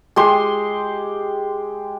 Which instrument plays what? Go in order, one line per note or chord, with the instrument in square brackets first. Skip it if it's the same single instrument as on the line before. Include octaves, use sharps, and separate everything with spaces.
[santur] G#3 G4 C6